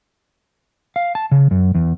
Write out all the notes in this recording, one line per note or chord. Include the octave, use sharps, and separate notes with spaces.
F5
A5
C#3
F#2
E2